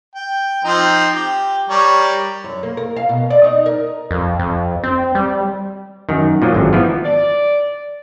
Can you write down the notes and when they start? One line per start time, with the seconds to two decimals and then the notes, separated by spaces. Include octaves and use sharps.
0.15 G5
0.64 F3 C4 D#4
1.13 G4
1.69 G3 A#4 C#5
2.44 F#2
2.63 A#3
2.77 A#4
2.96 F5
3.09 B2
3.30 D5
3.44 D#4
3.66 A#4
4.11 F2
4.39 F2
4.83 C4
5.15 G3
6.09 F#2 D#3
6.42 A#2 F3 F#3
6.55 G#1 F#2 D3
6.73 E3 F3 B3
7.05 D5